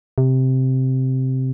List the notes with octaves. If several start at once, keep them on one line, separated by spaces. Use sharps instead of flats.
C3